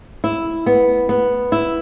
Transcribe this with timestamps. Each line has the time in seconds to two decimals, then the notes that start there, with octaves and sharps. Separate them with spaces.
0.24 E4
0.66 B3
1.09 B3
1.52 E4